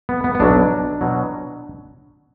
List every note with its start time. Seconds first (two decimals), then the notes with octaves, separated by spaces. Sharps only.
0.09 B3
0.24 B3
0.35 B3
0.40 B1 B2 F#3 D4
1.01 B2 F#3